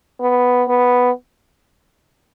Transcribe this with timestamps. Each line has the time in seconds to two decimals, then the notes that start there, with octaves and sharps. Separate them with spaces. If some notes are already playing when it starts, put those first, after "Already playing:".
0.21 B3
0.68 B3